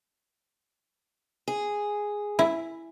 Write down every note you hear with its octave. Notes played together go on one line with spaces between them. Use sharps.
G#4
E4